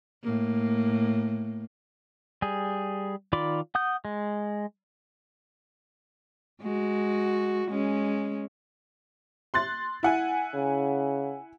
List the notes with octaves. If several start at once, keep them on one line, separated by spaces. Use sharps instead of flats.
A2 A#3
G3 G#4
D#3 F4 D5 B5 D6
F#5 D#6 G6
G#3
G#3 F#4
G#3 C#4
C6 F#6 A6
E4 F#5 G#5
C#3